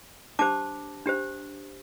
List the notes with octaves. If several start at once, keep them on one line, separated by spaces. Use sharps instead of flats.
D4 G4 C5 A5 D6
D4 G4 C5